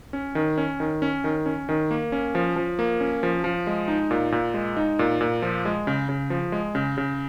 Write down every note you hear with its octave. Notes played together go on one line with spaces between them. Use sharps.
C#4
D#3
C#4
D#3
C#4
D#3
C#4
D#3
A#3
C#4
F3
F3
A#3
C#4
F3
F3
G#3
D#4
A#2
A#2
G#3
D#4
A#2
A#2
F3
G#3
C#3
C#3
F3
G#3
C#3
C#3